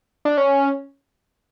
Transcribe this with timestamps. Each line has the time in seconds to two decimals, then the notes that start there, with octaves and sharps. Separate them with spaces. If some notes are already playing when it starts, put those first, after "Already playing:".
0.25 D4
0.37 C#4